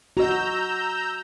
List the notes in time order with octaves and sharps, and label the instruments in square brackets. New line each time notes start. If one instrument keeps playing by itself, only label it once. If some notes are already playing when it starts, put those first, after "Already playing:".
[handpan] F#4 D#5 [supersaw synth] A#5 E6 G6